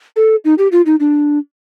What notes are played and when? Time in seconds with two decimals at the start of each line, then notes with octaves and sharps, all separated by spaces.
0.16 A4
0.45 D#4
0.58 G4
0.72 F4
0.86 D#4
1.00 D4